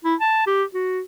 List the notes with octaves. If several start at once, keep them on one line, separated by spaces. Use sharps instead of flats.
E4
A5
G4
F#4